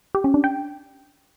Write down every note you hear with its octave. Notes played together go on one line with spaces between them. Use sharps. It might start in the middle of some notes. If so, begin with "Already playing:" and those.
G4
C#4
D4
G5